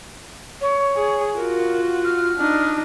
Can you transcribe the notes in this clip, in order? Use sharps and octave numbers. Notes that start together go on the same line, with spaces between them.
C#5
G#4
F4 F#4 A#4
F6
D4 D#4